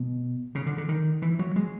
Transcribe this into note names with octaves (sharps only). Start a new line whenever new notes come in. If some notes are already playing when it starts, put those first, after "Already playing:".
Already playing: B2
C#3
D3
D3
D#3
E3
F#3
G#3